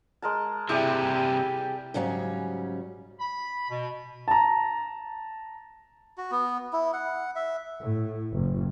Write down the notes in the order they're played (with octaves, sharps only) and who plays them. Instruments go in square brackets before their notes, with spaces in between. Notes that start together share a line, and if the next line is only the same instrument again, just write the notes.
[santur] G#3 A#4 A5
[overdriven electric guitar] C3 E3 [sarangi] G3 [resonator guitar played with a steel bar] E4 [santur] G4 G#4
[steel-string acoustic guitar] G#2 C#3 F#3 G3 C#4
[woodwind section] B5
B2
[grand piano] A5 A#5
[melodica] F#4
B3
E4
F#5
E5
[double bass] A2
F#1